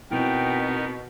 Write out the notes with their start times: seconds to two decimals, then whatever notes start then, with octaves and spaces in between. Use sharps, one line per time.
0.11 B2 B3 C4 D#4 E4 A#4 G5